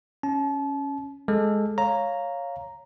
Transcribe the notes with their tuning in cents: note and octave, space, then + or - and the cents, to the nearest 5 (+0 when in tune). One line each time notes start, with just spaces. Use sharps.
C#4 +0 A5 -35
G#3 +0 A4 +0
C#5 +0 F5 +0 A#5 +0